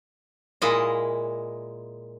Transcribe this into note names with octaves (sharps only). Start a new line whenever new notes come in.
A#2 G#3 E4 D#5 F5